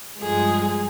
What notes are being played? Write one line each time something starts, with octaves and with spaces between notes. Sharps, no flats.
G2 F3 G#3 G#4